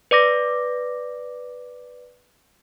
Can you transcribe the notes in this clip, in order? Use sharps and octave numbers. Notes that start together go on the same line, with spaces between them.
B4 D5 D6 A#6